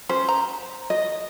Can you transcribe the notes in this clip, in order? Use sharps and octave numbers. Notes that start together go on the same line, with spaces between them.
C#4 C5
A#5
D#5